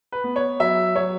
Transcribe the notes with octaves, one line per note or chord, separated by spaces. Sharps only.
B4
B3
C#5
F#3 E5
F#3 C#5